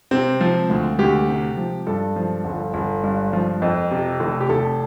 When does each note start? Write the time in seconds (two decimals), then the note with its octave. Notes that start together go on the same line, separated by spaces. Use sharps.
0.11 C3 C4
0.41 F3
0.69 D2
0.99 D2 G4
1.29 C3
1.57 F3
1.87 G2 A4
2.16 F3
2.45 G1
2.74 G1
3.03 G2
3.33 F3
3.62 F2
3.91 C3
4.20 F1
4.40 G4
4.49 F1 A4